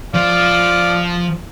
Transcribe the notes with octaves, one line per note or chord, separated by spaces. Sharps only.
F3 D5 F5